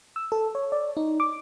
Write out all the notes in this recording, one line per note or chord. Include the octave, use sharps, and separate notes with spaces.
E6
A4
C#5
D5
D#4
D6